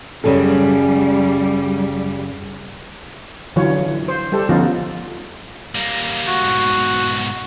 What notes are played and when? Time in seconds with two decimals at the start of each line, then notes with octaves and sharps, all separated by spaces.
0.24 F#2 C#3 G3 A4
3.56 D3 E3 F#3 F4 C#5
3.70 D4
4.08 C5
4.32 G3 G4 A4 C5
4.49 D3 F3 B3 C#4 D#4 F4
5.75 G3 A#3
6.28 F#4
6.45 G#2 B2